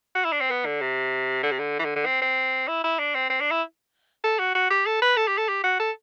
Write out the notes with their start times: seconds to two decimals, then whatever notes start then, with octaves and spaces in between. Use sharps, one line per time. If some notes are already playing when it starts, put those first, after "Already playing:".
0.15 F#4
0.24 E4
0.33 D4
0.41 C4
0.50 B3
0.65 D3
0.81 C3
1.43 D3
1.51 C3
1.59 D3
1.79 E3
1.85 D3
1.96 D3
2.06 C4
2.22 C4
2.68 E4
2.84 E4
2.99 D4
3.15 C4
3.30 C4
3.41 D4
3.51 E4
4.24 A4
4.39 F#4
4.55 F#4
4.71 G4
4.86 A4
5.02 B4
5.17 A4
5.28 G4
5.38 A4
5.48 G4
5.64 F#4
5.80 A4